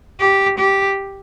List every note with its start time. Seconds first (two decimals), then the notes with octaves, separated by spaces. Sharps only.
0.20 G4
0.58 G4